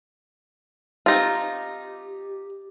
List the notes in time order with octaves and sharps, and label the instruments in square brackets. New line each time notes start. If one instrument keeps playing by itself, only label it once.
[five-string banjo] C4 D#4 F4 [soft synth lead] G4